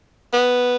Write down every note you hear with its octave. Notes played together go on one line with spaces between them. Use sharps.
B3